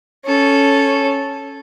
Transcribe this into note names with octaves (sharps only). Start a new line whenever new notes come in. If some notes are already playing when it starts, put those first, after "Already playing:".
C#4 A4